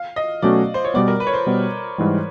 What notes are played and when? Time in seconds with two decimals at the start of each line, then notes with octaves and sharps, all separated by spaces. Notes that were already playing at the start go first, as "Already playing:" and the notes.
Already playing: F5
0.16 D#5
0.42 B2 F#3 A3 C#4 F#4 D5
0.74 C5
0.85 C#5
0.94 B2 G3 B3 D5
1.08 A#4
1.20 B4
1.27 C#5
1.34 C5
1.47 B2 G3 B3
1.98 G#2 E3 G3